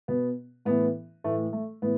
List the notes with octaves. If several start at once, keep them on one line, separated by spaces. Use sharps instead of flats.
B2 B3
A2 E3 B3
A2 E3 A3
A3
A2 E3 B3